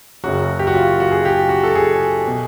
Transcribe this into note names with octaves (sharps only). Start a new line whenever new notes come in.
F#1 F#2 C#3 F#3 F#4
G4
F#4
F4
F#4
G#4
G4
F#4
A4
G#4
B2